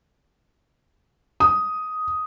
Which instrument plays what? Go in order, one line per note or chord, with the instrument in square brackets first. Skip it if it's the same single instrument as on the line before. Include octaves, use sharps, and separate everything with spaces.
[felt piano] D#6